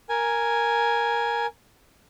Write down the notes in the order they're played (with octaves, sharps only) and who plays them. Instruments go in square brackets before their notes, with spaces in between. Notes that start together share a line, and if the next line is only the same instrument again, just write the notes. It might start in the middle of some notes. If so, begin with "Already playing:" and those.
[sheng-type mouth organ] A#4 G#5